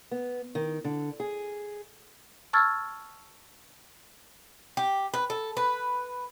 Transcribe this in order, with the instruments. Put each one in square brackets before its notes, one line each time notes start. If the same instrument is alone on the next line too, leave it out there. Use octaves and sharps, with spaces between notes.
[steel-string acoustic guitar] B3
D#3
D3
G#4
[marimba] A5 C#6 E6 F6 G#6 A6
[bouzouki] G4
B4
A4
B4